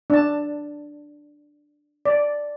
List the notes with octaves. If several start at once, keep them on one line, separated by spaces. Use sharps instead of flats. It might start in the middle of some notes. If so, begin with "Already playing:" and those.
D4 A5
D5